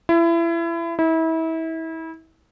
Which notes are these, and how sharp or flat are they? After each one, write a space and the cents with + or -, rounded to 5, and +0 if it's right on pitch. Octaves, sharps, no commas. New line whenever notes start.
E4 +30
E4 -30